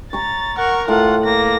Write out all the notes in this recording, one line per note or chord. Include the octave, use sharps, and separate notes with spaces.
C#5 A#5 A6
A#4 F#5 C#6
A2 F4 F#5
A#3 A#6